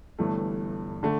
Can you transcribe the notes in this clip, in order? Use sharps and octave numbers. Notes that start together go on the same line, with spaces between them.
G1 G2 E3 A3
D3 A3